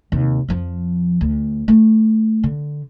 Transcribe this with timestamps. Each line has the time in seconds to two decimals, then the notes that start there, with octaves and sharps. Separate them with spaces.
0.12 D#2 C3
0.48 F2 F3
1.21 D2
1.68 A3
2.44 D3